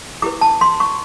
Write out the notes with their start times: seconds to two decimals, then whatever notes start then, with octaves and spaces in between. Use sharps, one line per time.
0.22 E4 G4 B4 D6
0.41 A5
0.61 C6
0.80 C#6